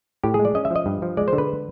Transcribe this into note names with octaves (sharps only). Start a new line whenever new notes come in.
A2 G4
G#4
G#3
D5
C#4 D#5
E5
F3
D#5
G2
F3
G#3 D5
C5
D3
B4